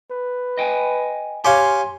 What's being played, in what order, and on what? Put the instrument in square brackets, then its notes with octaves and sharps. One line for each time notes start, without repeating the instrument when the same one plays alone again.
[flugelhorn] B4
[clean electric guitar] D#5 G5 G#5
[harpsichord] G4 C#5 F5 [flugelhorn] G#5 [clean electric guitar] C6